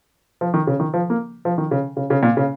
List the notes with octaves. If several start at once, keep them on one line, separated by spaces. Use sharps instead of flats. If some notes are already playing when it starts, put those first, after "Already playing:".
F3
D#3
C#3
D#3
F3
A#3
F3
D#3
C#3
C#3
C#3
A#2
C#3